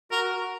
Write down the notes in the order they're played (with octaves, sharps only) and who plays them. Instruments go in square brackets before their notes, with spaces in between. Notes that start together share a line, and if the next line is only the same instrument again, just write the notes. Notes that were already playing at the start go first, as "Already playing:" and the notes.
[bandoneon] F#4 [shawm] A#4